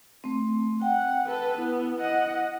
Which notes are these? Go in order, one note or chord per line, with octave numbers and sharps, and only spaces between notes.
A3 C4
F#5 G5
A4 B4
B3 E4
D#5 F#5